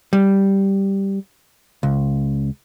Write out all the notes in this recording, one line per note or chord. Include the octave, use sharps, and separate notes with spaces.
G3
C#2